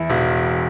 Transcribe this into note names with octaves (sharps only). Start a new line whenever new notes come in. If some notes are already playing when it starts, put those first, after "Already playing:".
Already playing: E2 E4
E1